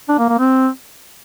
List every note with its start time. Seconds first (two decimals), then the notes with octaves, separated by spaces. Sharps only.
0.08 D4
0.19 A#3
0.29 A#3
0.39 C4